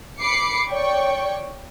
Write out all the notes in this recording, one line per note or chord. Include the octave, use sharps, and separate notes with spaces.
B5 D6 C7 C#7
C#5 D5 G5 C#6